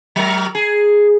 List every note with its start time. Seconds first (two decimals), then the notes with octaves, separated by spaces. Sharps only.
0.16 F#3 A#4
0.55 G#4